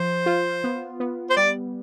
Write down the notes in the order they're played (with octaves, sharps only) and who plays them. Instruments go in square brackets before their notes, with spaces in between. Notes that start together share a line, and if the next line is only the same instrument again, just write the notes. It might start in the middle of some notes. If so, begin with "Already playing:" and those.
Already playing: [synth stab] F3 [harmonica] C5
[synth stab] F4
B3
B3
[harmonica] C5
[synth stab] G3 [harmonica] D5